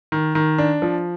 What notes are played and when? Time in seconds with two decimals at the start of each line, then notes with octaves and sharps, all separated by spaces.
0.12 D#3
0.35 D#3
0.58 D4
0.82 F3